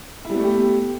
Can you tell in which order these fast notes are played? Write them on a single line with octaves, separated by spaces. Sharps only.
E4 G3 B3 A3 G4